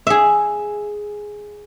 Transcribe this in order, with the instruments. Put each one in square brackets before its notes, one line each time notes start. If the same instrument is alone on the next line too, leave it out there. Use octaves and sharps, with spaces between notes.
[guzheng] G#4 E5